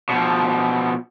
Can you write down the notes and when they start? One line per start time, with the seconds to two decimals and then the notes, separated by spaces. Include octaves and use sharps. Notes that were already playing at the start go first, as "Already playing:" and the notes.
0.09 B2 F3